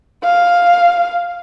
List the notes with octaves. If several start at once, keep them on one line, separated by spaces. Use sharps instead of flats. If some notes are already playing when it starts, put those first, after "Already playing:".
F5